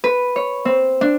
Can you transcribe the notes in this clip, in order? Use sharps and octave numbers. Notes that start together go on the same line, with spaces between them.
B4
C#5
C4
D4